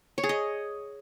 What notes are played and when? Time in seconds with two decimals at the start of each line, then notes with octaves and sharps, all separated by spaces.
0.18 C#5
0.23 G#4
0.29 D#5